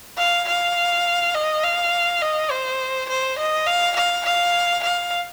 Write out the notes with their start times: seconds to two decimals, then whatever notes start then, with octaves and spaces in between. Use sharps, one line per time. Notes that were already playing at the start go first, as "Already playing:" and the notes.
0.19 F5
0.48 F5
1.35 D#5
1.64 F5
2.22 D#5
2.51 C5
3.09 C5
3.38 D#5
3.67 F5
3.96 F5
4.25 F5
4.83 F5